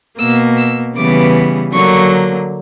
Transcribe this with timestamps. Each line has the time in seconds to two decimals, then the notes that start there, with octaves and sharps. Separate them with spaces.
0.18 B2 A#3 E6
0.57 E6
0.95 C#3 E3 G3 B3 D6
1.72 D3 F#3 A#3 C#6